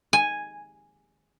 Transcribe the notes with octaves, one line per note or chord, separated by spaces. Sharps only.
G#5